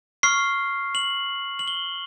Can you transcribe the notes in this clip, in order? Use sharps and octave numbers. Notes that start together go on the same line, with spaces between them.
C#6 F6 C7
F#7
F#7
G7